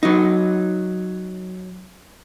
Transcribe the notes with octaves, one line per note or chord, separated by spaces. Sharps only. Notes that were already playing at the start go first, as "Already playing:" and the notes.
F#3 D#4